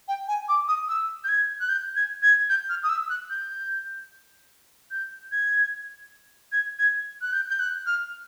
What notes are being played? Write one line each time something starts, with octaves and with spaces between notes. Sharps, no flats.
G5
G#5
D6
D#6
E6
G6
G#6
F#6
G6
G#6
G#6
G6
F6
D#6
E6
F#6
G6
G6
G#6
G#6
G#6
F#6
G6
G6
F#6
F6